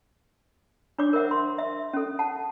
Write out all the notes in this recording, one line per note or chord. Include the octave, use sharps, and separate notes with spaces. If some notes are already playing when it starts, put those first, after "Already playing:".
D4 C#5 D6
A#4 C5 E5 F#5
C6
E5
C#4 A4
F#5 A5